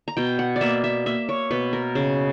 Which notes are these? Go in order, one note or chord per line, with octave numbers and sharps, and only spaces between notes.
A#5
B2 G5
F#5
D5
A#3 E5
E5
A#3 E5
C#5
B2 B4
A#4
C#3